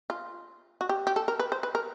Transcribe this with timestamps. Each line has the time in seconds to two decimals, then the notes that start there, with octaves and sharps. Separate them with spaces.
0.10 F4
0.81 F#4
0.89 G4
1.07 G4
1.16 A4
1.28 A#4
1.40 B4
1.52 C5
1.63 B4
1.75 A#4